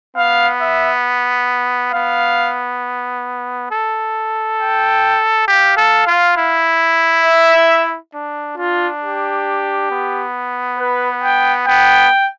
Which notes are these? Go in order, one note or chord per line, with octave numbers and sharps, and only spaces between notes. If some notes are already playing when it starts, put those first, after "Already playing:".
B3 F5
E5
B3 F5
A4
G5
G4 F5
A4
F4
E4
E5
D4
D4 F4
G4
B3
B4
G5
B3 G5